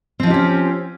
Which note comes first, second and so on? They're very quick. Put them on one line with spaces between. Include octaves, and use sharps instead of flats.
C4 F3 D#4 G4 C#4